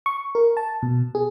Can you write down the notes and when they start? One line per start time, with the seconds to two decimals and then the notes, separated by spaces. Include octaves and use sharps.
0.06 C#6
0.35 A#4
0.57 A5
0.82 B2
1.15 G#4